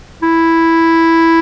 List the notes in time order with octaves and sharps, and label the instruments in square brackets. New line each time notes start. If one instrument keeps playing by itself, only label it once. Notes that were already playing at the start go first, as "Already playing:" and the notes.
[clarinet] E4